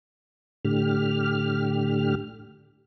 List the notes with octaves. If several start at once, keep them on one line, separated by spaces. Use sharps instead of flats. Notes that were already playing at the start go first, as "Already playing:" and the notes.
A2 D3 G4 F6